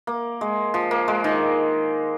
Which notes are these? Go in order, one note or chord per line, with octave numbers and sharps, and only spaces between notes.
A#3
G#3
F3
A#3
G#3
D#3